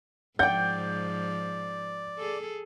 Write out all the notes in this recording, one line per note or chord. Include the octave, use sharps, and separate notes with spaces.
G#2 F3 D5 F#5 G5 G6
G#4 A4